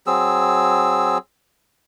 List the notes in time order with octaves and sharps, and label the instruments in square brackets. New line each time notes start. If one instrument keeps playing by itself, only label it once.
[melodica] F#3 C4 G#4 E6